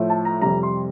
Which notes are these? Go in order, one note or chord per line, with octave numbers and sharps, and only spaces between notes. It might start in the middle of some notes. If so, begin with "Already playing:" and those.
Already playing: A2 F3 A3
A5
A#5
F2 C3 G3 A#5
C6